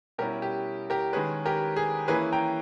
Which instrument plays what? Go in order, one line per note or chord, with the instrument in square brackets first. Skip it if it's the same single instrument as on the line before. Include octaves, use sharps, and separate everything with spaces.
[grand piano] B2 G3 C#4 E4 G4 A#4
G4
G4 A#4
D#3 G#3 C#4 G#4 B4
G4 A#4
G#4
E3 A#3 C#4 E4 G#4 B4
G5 A#5